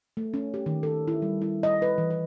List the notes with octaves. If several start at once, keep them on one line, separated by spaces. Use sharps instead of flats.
A3
C#4
G4
D#3
A4
E4
G3
E4
D#5
B4
E3
B4